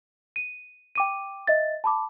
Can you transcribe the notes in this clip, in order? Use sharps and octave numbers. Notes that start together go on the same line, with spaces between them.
D#7
G5 D6 D#7
D#5 E5 A6
A5 B5 D6